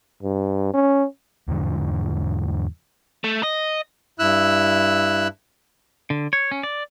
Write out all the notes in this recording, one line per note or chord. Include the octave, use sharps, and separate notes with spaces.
G2
C#4
E2 G#2 D3 F3
A3
D#5
G2 E4 E6 F#6
D3
C#5
C#4
D5